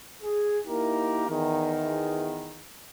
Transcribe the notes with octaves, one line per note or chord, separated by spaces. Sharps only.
G#4
A#3 D#4 E4 G4 A#4
E2 D#3